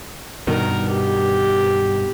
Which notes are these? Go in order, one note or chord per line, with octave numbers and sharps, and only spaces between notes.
G2 B2 D#3 A#4
G4